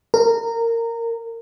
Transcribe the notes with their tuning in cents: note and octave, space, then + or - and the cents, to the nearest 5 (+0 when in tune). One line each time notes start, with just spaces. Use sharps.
A#4 -15 A#5 -20